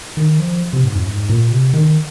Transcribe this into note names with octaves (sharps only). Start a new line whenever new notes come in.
D#3
F3
C3
G#2
F2
G#2
A#2
C3
D#3